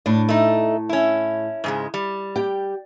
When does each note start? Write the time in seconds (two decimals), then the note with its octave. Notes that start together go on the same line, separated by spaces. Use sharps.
0.06 A2 D4
0.29 A3 D#4
0.89 C#4 E4
1.64 G#2 C#3 G#3
1.94 G3
2.36 G4 G5